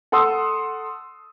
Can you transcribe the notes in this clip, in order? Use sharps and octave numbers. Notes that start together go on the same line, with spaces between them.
A4 F#5 C6 D#6 E6